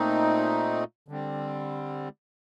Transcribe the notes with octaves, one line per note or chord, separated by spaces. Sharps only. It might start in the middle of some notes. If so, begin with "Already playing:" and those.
Already playing: A#2 A3 C4 D#4
D3 G3 C4